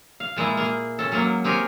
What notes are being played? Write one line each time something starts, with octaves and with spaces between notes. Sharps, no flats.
F5
A#2 G#3 A#3 E4
A#3 G#4
C#4 A4
F#3 G#3 A#3 C#4
C4 G4 G#4 A#4 C#5 G#5